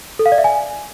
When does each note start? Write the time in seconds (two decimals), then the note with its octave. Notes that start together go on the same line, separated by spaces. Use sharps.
0.19 A4
0.26 F5
0.32 D5
0.38 E5
0.44 G#5